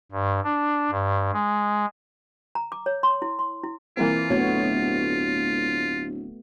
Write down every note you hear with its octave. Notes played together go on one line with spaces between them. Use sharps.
G2
D4
G2
G#3
A#5
D6
C#5
C6
E4
C6
E4
E3 A#3 C4 F4
D1 A3 B3 F#4 C#5